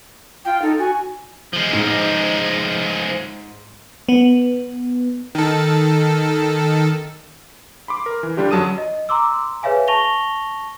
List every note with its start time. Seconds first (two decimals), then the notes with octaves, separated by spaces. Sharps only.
0.45 F4 G5
0.62 D#4 A4
0.79 F#4 G#5
1.53 F3 G#3
1.73 G#2
4.09 B3
5.35 D#3 A4
7.88 B5 C6 D6
8.06 A#4
8.23 E3
8.37 D3 G3 D4 F4 G4
8.51 F#2 F#3 A5 D#6 D#7
8.78 D#5
9.09 A#5 C6 D6 E6
9.63 G#4 B4 C#5 E5 F5 G#5
9.88 A5 C#6 A#6 F7 G7